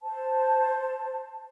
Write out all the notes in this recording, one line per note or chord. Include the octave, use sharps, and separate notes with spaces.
C5 A5